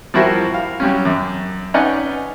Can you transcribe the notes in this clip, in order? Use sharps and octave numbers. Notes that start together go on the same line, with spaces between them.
F3 G3 E4 F#4 A#4 C5
F5
F#3 G3 C#4
F#2
C#4 D#4 B4 D5 F#5 G#5